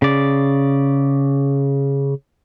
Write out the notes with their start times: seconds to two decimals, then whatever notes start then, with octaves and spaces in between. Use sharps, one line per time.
0.02 C#3 D5